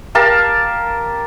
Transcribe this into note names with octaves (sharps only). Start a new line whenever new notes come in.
G4 A#4 F5 A5